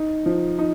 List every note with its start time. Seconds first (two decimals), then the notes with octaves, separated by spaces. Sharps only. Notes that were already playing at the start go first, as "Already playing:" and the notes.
Already playing: D#4
0.26 F3
0.59 D#4